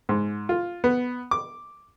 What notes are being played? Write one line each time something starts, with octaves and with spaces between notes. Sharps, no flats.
G#2
F4
B3
D6